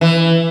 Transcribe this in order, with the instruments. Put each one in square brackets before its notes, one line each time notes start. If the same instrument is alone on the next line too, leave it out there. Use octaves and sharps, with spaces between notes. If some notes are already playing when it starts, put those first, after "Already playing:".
[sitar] E3